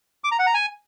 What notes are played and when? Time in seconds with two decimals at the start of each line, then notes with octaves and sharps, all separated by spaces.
0.24 D6
0.32 A#5
0.39 F#5
0.47 A#5
0.54 G#5